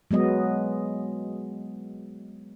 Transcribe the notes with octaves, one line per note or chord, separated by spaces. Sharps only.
F#3 G#3 B3 D#5